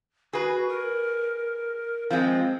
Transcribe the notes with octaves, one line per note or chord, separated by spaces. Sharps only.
F#4 G#4 B4
A#4
F3 G#3 C4